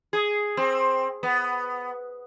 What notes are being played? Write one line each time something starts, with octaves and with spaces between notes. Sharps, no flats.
G#4
C4
B3